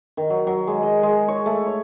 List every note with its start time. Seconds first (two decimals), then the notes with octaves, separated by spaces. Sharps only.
0.17 D#3
0.30 F#3
0.47 F#3
0.67 G#3
0.83 D#5
1.03 G#3
1.28 C#5
1.46 A3
1.66 C#5